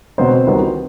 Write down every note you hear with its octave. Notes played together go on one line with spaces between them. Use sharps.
B2 F#3 B3 C4 C5
C2 C3 D#3 F#3 B3